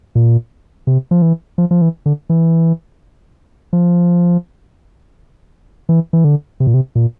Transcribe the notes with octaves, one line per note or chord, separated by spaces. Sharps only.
A#2
C3
F3
E3
F3
F3
E3
D3
E3
F3
E3
E3
D3
C3
A#2
C3
A#2